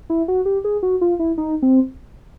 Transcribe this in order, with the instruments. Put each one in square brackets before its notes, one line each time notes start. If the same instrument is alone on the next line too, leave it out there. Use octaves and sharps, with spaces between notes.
[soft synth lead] E4
F#4
G4
G#4
F#4
F4
E4
D#4
C4